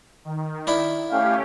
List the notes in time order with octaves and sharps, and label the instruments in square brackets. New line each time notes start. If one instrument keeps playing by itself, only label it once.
[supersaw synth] D#3
[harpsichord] D4 E4 B5
[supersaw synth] A3 C#4 G4 [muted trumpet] F5